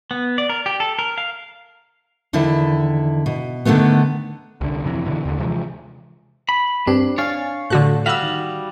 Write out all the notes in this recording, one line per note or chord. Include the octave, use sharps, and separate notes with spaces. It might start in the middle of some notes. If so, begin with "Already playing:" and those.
B3
D5
A#4
G4
A4
A#4
F5
E2 D3 D#3 E4
B2
D3 D#3 F#3 A3 B3
C2 D3
F2 C3 D#3 E3
B2 D3 E3
D#2 D3
C3 E3 F3 G#3
B5
G2 C4 D4
D4 C#5 F5 G#5 A6
A2 D3 F#4 A4 A5 F#6
G3 F#4 F5 E6 B6
D#3